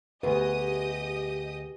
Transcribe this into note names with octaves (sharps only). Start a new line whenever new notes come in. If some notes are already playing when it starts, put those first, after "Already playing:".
D2 G4 G#4 B4 D#5 D#6